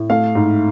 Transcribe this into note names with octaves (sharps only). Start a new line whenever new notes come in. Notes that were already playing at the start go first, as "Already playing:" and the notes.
Already playing: A2
A3 F5
G#2